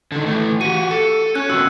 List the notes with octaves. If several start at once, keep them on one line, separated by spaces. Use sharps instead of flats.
D3 D#3
E3 A3
F#4 G4 D#7
A4 C#7
C#4 F#6
D#3 B3 F#4 E6